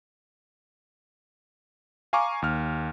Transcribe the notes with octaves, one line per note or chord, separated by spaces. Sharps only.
F5 G#5 A#5 C#6 D6
D#2 F6